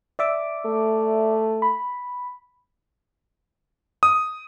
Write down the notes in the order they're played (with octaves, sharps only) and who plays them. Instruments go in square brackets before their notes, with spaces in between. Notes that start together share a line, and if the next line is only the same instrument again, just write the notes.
[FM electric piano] D5 E5 D6
[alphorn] A3
[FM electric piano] B5
[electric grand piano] D#6